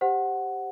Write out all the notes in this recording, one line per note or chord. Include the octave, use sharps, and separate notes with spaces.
G4 C5 F#5